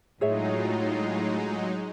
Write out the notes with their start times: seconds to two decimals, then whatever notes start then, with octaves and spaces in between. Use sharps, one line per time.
0.21 A2 F#3 G#3 D#4 F4 G#4 C#5 E5